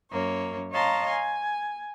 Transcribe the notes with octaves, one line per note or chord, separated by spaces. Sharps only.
F#2 A#3 C#5
C#5 D#5 F5 A5 A#5 C6
G#5